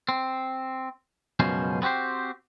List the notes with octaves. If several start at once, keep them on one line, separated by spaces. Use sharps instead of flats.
C4
C#2 F#2 B2 F3 C#4 C5
B3 C4 F#4 G4 C5